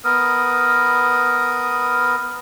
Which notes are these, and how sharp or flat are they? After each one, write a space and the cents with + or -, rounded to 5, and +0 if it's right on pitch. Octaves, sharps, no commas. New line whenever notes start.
B3 +0 A#4 +0 D#6 +0